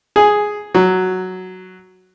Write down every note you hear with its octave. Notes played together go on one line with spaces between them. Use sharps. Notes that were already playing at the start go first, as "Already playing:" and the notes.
G#4
F#3